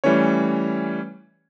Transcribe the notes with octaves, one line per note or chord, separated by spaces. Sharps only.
E3 G3 A3 C#4 C#5